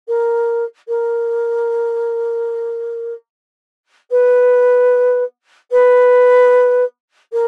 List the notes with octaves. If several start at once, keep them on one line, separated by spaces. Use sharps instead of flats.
A#4
A#4
B4
B4
A#4